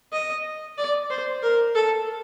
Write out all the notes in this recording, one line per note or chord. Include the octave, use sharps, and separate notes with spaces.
D#5
D5
C5
A#4
A4